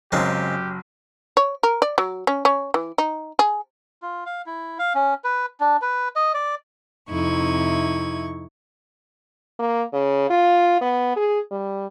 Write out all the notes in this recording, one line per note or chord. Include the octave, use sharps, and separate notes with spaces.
F#1 C#3 F#3 G#3 C4 G4
C#5
A#4
D5
F#3
C#4
C#4
E3
D#4
G#4
F4
F5
E4
F5
C#4
B4
D4
B4
D#5
D5
F2 C3 D#4 E4 C#6 G#6
A#3
C#3
F4
B3
G#4
G3